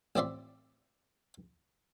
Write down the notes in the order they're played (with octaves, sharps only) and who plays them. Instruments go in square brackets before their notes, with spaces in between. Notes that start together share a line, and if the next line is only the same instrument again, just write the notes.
[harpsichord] A1 C4 D5 E5 C6